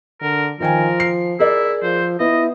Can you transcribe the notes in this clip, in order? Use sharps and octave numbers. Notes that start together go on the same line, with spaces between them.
D3 A#4
D#3 F3 A#4 G5 G#5
C7
E4 G#4 A#4 D5
F3 C5
B3 E4 D#5